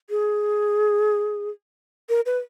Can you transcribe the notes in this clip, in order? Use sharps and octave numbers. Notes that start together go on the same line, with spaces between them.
G#4
A#4
B4